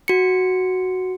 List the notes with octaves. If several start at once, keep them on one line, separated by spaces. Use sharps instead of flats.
F#4 C#7